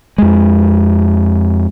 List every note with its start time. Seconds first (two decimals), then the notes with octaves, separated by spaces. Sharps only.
0.18 F2 G#3